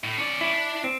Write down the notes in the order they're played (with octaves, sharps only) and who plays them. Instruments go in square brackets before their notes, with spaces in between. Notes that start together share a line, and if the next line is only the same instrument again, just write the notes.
[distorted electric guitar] A2
C#4 D5
[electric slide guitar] E4
[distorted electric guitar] D4
[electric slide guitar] C4